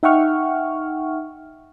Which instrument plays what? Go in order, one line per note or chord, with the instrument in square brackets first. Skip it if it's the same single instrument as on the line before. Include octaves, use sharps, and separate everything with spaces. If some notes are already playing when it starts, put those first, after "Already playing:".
[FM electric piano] D#4 E5 F#5 G5 C#6 F6